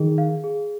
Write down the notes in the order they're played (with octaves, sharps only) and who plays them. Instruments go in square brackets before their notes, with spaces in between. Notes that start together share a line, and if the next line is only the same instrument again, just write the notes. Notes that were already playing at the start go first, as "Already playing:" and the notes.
Already playing: [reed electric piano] D#3 [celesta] G#4
[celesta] F5
G#4